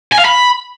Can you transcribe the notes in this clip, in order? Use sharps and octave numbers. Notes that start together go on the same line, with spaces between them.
G#5
F5
B5